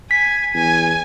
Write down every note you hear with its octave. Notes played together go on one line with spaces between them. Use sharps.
G#5 B6
E2 G#5